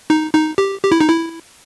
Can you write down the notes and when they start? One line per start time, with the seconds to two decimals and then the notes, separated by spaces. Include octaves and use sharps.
0.10 D#4
0.35 D#4
0.58 G4
0.84 G4
0.92 E4
1.01 D#4
1.09 E4